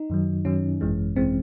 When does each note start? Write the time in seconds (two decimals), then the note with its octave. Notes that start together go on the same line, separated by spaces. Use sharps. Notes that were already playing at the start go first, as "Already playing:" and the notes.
Already playing: D#4
0.10 F#2 D#3 F#3
0.45 F#2 D#3 F#3 C#4
0.81 G#1 F#2 E3 G#3
1.16 G#1 E3 G#3 C4